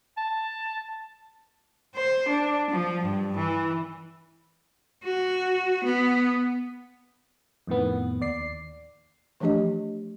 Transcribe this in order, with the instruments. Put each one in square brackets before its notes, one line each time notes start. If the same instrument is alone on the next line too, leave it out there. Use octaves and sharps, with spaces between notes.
[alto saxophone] A5
[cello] C5
D4
F3
G2
E3
F#4
B3
[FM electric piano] F2 A2 D#3 B3
D#2 D5 C7
[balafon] E3 F3 A3 D4 G4 D#5